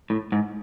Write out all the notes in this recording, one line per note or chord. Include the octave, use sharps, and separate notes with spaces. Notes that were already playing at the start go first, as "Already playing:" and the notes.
A2
G#2